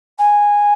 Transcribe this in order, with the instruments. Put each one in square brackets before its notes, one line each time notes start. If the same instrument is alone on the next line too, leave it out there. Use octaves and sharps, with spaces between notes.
[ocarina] G#5